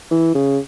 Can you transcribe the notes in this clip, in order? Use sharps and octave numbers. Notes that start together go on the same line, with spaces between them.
E3
C#3